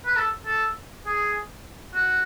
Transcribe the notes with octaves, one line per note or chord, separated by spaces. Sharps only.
B4
A4
A4
G#4
F#4